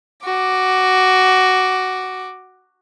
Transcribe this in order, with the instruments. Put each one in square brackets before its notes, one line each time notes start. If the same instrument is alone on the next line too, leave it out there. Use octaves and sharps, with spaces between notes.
[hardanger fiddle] F#4 D6